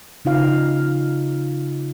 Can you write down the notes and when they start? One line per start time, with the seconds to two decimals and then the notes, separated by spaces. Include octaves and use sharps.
0.25 C#3 D#4 F4 F5